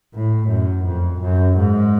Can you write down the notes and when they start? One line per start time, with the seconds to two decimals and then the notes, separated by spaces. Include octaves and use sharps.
0.14 A2
0.49 F#2
0.85 F2
1.21 F#2
1.58 G#2